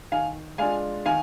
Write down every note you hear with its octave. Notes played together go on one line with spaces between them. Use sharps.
D#3 F5 G#5
G#3 D4 F4 F5 G#5
D#3 F5 G#5